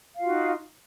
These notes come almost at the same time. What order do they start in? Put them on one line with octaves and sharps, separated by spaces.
F5 F4 F#4 D#4